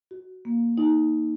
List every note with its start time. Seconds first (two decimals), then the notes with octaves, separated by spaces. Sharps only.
0.11 F#4
0.45 A#3
0.78 D#4